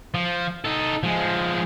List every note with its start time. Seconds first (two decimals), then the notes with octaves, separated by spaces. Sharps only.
0.14 F3
0.65 D#4 A4
1.03 F3 G#3